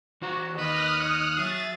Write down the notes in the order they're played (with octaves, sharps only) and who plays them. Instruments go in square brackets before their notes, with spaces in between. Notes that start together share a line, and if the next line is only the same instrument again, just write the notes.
[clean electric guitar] E3 C5 A#5 [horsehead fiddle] F#4
[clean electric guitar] D#2 D#3 [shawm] B4 [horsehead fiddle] D#5 [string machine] D#6 F6 F#6
[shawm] C#5
[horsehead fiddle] F#3 E5 [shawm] G#4 [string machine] A6